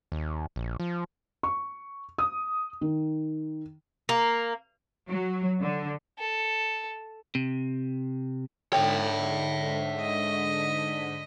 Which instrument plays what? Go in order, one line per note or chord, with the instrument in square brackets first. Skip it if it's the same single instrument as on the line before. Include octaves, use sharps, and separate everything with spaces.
[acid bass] D#2
A#1
F3
[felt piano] C#6
D#6
D#3
[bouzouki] A#3
[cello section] F#3
D3
[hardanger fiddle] A4
[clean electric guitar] C3
[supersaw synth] G#2 D3 B6 [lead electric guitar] C#5 E5 [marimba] G5
[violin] D#5